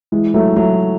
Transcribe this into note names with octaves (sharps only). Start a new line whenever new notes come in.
E3 G#3
F#3 A3
F#3 A3